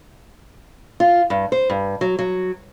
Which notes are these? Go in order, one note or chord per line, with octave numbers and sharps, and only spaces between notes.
F4
G2
C5
G2
F#3
F#3